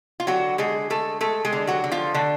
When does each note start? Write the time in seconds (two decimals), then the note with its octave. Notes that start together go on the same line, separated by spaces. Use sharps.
0.20 F4
0.27 D3 F#3 F#4
0.58 D3 G#3 G#4
0.90 G#3 A3 A4
1.21 G#3 A3 A4
1.45 G#3 G#4
1.52 D3
1.67 F#3 F#4
1.84 D3
1.91 F3 F4
2.14 D3 A3 D4